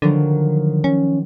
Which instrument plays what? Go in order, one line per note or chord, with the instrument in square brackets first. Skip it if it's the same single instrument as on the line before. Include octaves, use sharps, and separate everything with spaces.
[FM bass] D3 [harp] D#3 F3 F#3
[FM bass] C#4